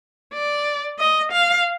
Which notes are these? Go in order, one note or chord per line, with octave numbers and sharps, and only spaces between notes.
D5
D#5
F5